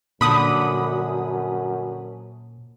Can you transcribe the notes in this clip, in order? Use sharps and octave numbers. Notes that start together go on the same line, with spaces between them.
F#2 A#2 D3 F3 D4 B5 D#6